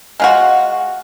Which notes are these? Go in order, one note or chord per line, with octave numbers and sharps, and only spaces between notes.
G#3 F4 F#4